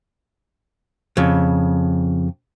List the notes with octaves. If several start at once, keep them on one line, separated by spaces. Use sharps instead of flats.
F2 C#3